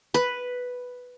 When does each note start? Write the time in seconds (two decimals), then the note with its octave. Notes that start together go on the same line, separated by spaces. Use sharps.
0.14 B4